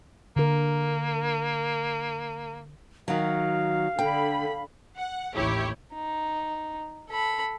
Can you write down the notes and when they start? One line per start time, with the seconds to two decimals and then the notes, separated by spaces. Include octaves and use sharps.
0.36 D3 A#3 A#4
3.08 D#3 F#3 F5
3.99 D3 G5 B5
4.98 F#5
5.34 A1 D#2 E4 G4 C#5
5.94 D#4
7.10 A4 B5